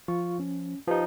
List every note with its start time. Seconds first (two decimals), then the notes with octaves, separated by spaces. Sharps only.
0.08 F3 F4 F5 C#6
0.40 C#4
0.87 F3 D#4 G4 B4